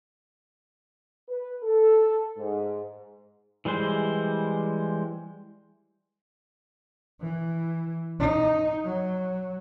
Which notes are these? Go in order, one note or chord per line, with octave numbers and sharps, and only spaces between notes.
B4
A4
G#2
E3 G3 G#3 C5
E3
D#4
F#3